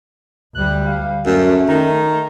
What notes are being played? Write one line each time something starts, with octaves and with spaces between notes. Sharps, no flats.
D2 G3 F#6
F5
F#2 A3 C#4
D#3 A#5